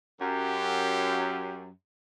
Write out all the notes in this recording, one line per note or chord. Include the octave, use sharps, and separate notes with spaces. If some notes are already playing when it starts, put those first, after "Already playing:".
F#2 G4